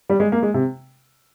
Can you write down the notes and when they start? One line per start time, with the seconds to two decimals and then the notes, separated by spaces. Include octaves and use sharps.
0.09 G3
0.20 G#3
0.32 A#3
0.43 G#3
0.54 C3